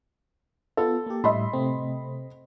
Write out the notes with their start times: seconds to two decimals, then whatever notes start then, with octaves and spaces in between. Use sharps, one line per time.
0.77 B3 F4 A4
1.06 A#3 G4
1.24 A2 G3 D#5 E5 B5 C6
1.53 C3 A3 C4